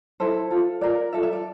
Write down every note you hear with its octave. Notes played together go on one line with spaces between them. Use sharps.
E4 A4 C5
F4 A4
F4 A#4 D5
F4 A4 E5
E5
D5